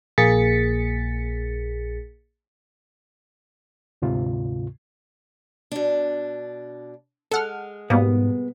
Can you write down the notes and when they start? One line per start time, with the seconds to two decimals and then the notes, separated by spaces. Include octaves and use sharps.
0.18 A#1 A#3 G#4 A6 B6 C#7
4.02 D2 G#2 C3 F4
5.72 B2 D4
7.31 G#3 A4 F#5 F6
7.90 G#2 B2 G3 A#3 B3